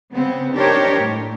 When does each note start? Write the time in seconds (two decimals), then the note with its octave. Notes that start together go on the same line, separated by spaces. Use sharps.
0.13 C#3 B3 C4
0.53 D4 D#4 G4 A#4 C5 C#5
0.96 A2